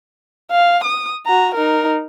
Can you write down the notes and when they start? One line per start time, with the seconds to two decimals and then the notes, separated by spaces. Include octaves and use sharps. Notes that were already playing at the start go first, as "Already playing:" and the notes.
0.51 F5
0.84 D#6
1.26 F#4 A#5
1.55 D#4 A#4